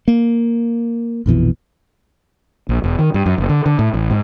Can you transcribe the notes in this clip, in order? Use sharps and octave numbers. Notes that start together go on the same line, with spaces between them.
A#3
A#1 F2 B2 E3
A#1
E1
D#3
G2
F#2
F#1
D3
D3
A2
A1
G#2